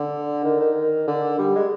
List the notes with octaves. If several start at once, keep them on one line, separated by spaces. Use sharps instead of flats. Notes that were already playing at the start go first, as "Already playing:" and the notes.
Already playing: D3
D#3
D#3
D3
G3
G#3